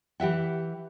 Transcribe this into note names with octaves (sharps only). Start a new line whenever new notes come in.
E3 G4 E5 F#5